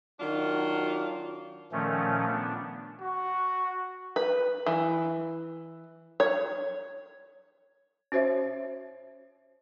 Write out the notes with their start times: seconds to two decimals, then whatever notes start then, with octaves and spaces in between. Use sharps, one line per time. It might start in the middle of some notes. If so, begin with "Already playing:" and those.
0.20 D#3 F#3 D4 F4 F#4
1.72 A#2 D#3 F3 A3 C#4
2.27 B3 D4
3.00 F#4
4.16 B4
4.66 E3
6.20 C#5
8.12 C#4 F#4 C5 C#5 E5